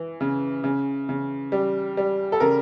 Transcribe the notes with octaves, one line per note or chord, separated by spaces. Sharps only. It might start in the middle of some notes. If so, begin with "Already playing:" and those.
Already playing: E3
C#3
C#3
C#3
G3
G3
A4
C#3 A#4